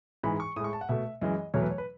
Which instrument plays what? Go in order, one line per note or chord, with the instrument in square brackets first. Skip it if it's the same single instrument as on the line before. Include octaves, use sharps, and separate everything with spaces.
[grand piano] G#2 E3 G#3 B5
C#6
A2 D#6
G#3 C#6
A5
F#5
B2 A3 E5
F#2 E3 G#3 D#5
E2 B2 F#3 A3 C#5
B4
C#5
B4